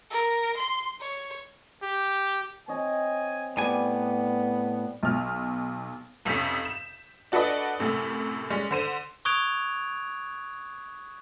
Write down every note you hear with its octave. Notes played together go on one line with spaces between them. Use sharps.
A#4
C6
C#5
G4
C4 C#5 D#5 G#5
A2 G3 B3 G#5 D6
B1 F6
B1 F2 C3 C#4 G6 B6
E7
D4 F#4 A4 B4 D5 D#5
F#2 A2 C3 A3
G3 G#3 C#4
D3 C5 D#7
C#6 D#6 F#6 G#6 D7 F7